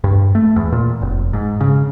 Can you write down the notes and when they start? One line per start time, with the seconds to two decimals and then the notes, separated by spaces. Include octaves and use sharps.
0.04 G2
0.35 A3
0.56 E2
0.72 A#2
1.02 F1
1.33 G#2
1.61 C#3